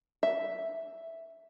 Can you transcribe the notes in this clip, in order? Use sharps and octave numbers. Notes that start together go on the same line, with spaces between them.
E5